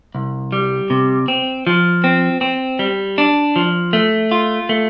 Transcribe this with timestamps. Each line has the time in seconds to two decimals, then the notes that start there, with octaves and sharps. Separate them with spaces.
0.15 C2
0.52 G3
0.90 C3
1.28 C4
1.67 F3
2.04 C4
2.41 C4
2.79 G3
3.18 D4
3.56 F3
3.93 A3
4.31 F4
4.69 A3